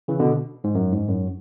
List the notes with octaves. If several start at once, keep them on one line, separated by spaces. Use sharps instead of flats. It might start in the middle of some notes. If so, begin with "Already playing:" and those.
C#3 E3
B2 D3
G#2
F#2
G#2
F#2